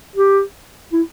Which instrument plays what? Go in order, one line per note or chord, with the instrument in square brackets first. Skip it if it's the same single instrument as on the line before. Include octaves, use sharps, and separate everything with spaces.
[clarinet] G4
E4